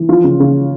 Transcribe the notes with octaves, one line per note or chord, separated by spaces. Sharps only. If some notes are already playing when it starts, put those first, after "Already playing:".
Already playing: E3
F3 F4
C#3
C#3